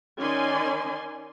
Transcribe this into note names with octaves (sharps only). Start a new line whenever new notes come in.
D#3 C#4 D#4 D5 G#5 C6